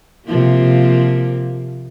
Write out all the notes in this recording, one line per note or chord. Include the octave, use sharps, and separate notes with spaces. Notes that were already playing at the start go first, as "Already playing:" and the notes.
C3 F3 A#3